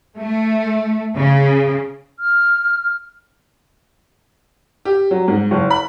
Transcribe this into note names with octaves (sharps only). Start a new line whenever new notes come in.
A3
C#3
F6
G4
F#3
G#2
F#1
B5